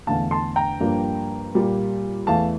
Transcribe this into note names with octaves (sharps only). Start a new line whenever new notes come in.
E2 D3 A3 F5 A5
A5 C6
G5 A#5
G2 F3 A#3 D4
A#2 G3 A#3
E2 E3 A3 F5 A5